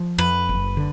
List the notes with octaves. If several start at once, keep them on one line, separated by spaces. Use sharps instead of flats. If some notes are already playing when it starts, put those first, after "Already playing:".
Already playing: F3
F2 B4
F#1
D3